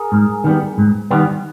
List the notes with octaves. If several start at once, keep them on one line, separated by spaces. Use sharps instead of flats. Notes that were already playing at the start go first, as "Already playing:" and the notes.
Already playing: G#4 A#4
G#2
D#3 G3 B3
G#2
D#3 G3 B3